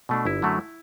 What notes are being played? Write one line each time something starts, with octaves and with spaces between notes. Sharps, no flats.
B2 A3 D4
G1 E4
F#2 D3 F#3 A3